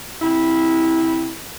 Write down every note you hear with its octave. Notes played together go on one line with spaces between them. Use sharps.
C3 E4